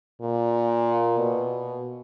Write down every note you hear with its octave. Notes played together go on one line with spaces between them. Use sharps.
A#2
B2